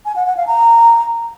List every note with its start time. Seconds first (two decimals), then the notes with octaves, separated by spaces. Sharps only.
0.06 G#5
0.16 F#5
0.26 F#5
0.37 F5
0.47 A#5